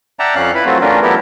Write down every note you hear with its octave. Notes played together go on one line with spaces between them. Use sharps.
D5 E5 F#5 G5 A5 A#5
F2 C#4 D5 F5 F#6
E4 B4 B5
F#3 A3 C4 F4 F#4
E3 A3 C#4 D4 F4 A#4
F#3 B3 E4 G4 A4 A#4